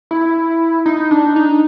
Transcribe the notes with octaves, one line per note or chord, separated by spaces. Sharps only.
E4
D#4
D4
D#4